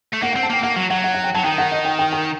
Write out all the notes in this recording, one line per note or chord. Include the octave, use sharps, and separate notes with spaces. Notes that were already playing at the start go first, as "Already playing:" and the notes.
A3
A#3 F#5
F#5
C4
A5
A#3 G5
A#3 F#5
F#3
F#3 F#5
F#5
F#5
G5
F#3 A5
D#3 G5
F#5
D#5
G5
G5
G5